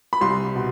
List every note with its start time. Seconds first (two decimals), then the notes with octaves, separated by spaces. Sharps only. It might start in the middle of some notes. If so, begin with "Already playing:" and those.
0.13 B5
0.21 C2 C6
0.55 B2